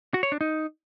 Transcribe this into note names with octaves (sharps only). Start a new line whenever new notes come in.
F#4
C#5
D4
D#4